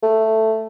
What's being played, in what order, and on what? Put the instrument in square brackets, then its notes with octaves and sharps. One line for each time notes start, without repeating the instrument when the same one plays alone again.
[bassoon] A3